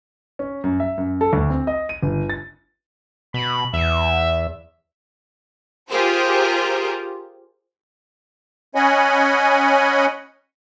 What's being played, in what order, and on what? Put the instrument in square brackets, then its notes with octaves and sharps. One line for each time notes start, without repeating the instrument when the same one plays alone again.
[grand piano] C#4
F#2
E5
F#2
A4
D2
C4
D#5
D#7
G1
A6
[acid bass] B2 [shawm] B5
[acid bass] E2 [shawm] E5
[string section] F4 G4 G#4 A#4 C5
[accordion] C#4 C#5 D#5 F#5 G#5 B5